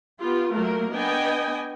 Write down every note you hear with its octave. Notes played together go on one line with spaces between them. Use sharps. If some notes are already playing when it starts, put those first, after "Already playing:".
B3 F4 G4
F#3 A3 A#3 A#4
B3 D4 D#5 G5 G#5